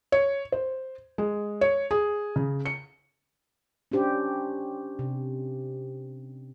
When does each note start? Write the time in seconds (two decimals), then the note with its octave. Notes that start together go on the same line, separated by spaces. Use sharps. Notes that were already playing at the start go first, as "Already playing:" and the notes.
0.12 C#5
0.52 C5
1.18 G#3
1.61 C#5
1.91 G#4
2.36 C#3
2.66 C#7
3.92 C#4 D4 G4 C5
4.99 C3